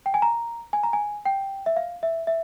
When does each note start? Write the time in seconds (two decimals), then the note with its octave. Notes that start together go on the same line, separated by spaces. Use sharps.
0.06 G5
0.14 G#5
0.22 A#5
0.73 G#5
0.83 A#5
0.93 G#5
1.25 G5
1.66 E5
1.76 F5
2.03 E5
2.27 E5